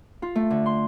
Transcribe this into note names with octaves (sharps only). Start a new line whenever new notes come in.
F4
A3
D3
C6